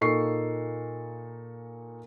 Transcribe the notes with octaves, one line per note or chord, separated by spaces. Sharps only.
A#2 A#3 D#4 A4 C#6 C7